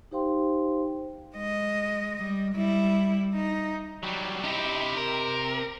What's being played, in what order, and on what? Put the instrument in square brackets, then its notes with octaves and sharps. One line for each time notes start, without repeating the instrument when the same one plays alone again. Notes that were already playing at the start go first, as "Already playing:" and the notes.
[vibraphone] D#4 G4 C5 F5 G5 C6
[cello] G#3 D#5
G3
G3 E4
D#4
[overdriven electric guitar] F#3 G3
[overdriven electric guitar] C3 G4 [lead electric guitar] D#4 E4
[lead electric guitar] A#4